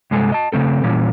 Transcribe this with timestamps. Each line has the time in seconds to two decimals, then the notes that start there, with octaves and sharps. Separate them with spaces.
0.11 G2 C3 G#3 A4 G#5
0.32 D#5 A5
0.53 C#3 A3 C4 A4
0.84 A#2 E3 G3 C#4